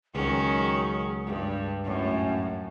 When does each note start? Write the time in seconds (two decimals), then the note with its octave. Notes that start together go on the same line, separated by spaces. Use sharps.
0.15 C#2 D#3 F#3 C#4 G#4
1.26 G2
1.84 F#2 A2 C#4